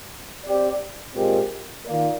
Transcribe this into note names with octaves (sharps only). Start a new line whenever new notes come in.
C4 G4 D5
A#2 G#3 C4 G4 A#4
D#3 A#3 F4 A#4 D5